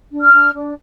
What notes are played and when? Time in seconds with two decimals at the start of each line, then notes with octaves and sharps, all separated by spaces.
0.11 D4
0.21 F6
0.33 D4
0.54 D4